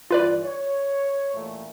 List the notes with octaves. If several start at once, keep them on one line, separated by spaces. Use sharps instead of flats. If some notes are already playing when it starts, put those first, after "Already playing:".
G2 D3 E3 F4 B4 D5
C#5
A1 A#2 A3